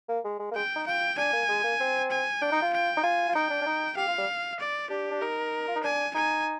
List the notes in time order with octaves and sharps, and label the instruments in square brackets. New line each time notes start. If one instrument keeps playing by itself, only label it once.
[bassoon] A#3
G#3
G#3
A#3
[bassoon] G#3 [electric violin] G5
[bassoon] D#4
[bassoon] F4 [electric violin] G5
[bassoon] D4 [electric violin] G#5
[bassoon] A#3
G#3
A#3
C4
[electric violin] G#5
[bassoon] D4 [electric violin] G5
[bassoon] D#4
F4
[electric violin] G5
[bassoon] D#4
[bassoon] F4 [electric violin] G#5
[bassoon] F4
[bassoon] D#4 [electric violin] G5
[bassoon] D4
D4
D#4
[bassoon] G4 [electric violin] F5
[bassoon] F4
G3
[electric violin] D5
[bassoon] D4 [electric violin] G4
[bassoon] D4
[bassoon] D#4 [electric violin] A#4
[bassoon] F4
D#4
[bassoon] D4 [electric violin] G#5
[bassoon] D#4 [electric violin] G#5